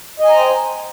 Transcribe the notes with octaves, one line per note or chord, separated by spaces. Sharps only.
C5 D#5 G5 G#5 A#5